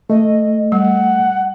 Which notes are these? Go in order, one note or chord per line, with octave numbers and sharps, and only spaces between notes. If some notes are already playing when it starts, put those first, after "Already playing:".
A3 D#5
G3 F#5